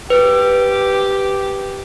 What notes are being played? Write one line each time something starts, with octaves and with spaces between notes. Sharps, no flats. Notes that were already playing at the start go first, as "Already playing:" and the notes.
G4 B4